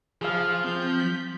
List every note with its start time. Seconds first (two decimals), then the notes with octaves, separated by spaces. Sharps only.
0.22 F3 G#4 F5 F6
0.64 C4 G6
1.00 B6